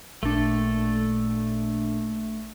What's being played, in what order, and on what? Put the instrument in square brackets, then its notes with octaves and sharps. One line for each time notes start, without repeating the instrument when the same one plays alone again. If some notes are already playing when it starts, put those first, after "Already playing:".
[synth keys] A1 A#2 D4 [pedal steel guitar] A3 A4